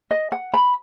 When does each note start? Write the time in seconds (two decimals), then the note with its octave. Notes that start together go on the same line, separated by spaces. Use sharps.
0.11 D#5
0.32 F#5
0.54 B5